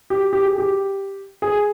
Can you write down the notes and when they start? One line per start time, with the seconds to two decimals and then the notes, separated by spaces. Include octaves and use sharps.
0.10 G4
0.33 G4
0.45 G#4
0.58 G4
1.42 G#4